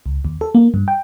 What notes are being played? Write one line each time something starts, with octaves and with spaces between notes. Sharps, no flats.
C#2
D#2
A4
A#3
G2
G5